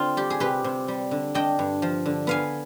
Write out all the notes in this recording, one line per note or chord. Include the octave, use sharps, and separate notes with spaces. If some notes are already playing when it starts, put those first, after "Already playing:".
Already playing: D3 C4 F4
G3 G4
G#4
C3 G4 B4
C3
G3
D3
D4 D#5 G5
G2
F3
D3
B3 F5 G#5